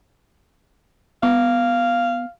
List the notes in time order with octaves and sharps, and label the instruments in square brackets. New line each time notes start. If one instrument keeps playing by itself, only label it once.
[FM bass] B3 [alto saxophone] F5